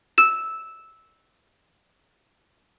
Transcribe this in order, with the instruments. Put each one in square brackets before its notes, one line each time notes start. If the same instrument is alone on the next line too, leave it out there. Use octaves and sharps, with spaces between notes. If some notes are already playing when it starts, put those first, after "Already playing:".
[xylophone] E6 E7